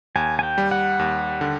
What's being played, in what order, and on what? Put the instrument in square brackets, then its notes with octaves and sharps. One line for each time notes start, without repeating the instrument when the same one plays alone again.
[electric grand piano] D#2 [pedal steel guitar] G#5
[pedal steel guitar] G#5
G5
[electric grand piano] G3
[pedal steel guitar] F#5
[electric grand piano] D#2
D3